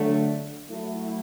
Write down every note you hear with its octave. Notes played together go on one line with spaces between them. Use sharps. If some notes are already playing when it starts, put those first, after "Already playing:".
Already playing: D3 F#3 A3
F#3 A3 E4